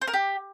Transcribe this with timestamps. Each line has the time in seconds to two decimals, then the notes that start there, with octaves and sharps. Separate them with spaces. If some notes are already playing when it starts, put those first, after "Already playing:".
0.02 C5
0.07 A#4
0.13 G4